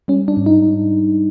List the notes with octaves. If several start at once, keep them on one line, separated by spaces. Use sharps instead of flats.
G3 C#4
D4
G#2
D#4